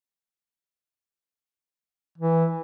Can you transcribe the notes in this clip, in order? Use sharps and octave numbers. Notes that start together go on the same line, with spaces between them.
E3